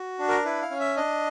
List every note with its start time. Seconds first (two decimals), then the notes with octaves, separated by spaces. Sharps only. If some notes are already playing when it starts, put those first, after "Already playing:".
Already playing: F#4
0.19 D4
0.28 A#4
0.45 E4 B4
0.62 F5
0.70 C#4
0.80 E5
0.96 D4 D#5